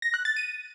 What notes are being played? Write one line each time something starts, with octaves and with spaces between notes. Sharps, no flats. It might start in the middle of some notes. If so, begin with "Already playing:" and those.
A#6
F#6
A6
D#7